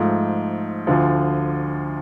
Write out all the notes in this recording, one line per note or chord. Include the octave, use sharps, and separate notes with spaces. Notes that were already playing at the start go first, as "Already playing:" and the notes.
Already playing: G#2 F3 A3
D2 D3 F3